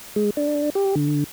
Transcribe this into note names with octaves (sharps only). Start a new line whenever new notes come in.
G#3
D4
G4
D3